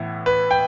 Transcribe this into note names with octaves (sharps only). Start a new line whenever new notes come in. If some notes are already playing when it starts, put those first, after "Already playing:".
Already playing: A2 E3 B3 E4
B4
G5